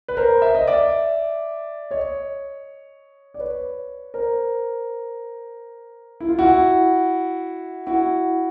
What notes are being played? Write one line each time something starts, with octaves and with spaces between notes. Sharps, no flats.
B4
A#4 C5
E5
D#5
D5 E5
C#5 D#5
D5
B4 C#5
A#4 C5
E4
F4
E4 F#4
E4 F#4